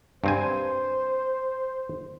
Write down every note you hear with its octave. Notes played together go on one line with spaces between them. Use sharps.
G2 C4 C5 G#5